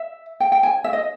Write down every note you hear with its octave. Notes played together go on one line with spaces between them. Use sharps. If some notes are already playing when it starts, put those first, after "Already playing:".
Already playing: E5
G5
G5
G#5
E5
D#5